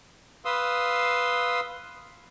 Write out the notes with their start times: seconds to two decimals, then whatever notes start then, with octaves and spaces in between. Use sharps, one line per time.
0.45 B4 F5 C6 D#6 E6